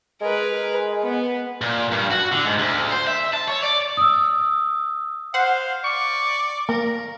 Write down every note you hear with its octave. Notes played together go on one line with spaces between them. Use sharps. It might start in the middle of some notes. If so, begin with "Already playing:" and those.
G#3 A#4 B4
B3
A#2
G2
F#4
D3
G#2
D2
C5
E5
A5
C#5
D5
D#6 E6
C5 F5 F#5
D5 C#6
A#3 A#4